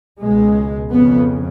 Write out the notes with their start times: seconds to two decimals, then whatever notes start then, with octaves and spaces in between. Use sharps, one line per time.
0.22 C#2 B2 G#3
0.91 F2 C#3 B3